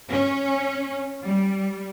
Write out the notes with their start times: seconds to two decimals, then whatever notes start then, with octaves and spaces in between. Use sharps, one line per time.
0.11 C#4
1.26 G3